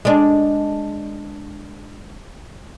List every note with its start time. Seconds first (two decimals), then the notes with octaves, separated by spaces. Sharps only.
0.05 G#3 D4